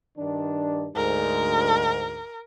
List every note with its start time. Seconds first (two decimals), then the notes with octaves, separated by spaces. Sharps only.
0.18 G2 D#3 D4
0.96 D2 G#2 A#4